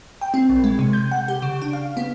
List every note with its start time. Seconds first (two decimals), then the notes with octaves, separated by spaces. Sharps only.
0.21 G5
0.34 C4
0.49 A#1
0.64 G#3
0.79 C3
0.93 G6
1.12 F#5
1.28 G4
1.42 C#3
1.62 D4
1.73 F5
1.97 B3